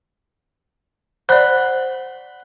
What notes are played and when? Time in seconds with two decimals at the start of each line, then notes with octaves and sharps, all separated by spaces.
1.29 C5 D5 F#5 B5 C6